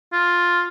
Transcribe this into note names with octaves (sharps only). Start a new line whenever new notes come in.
F4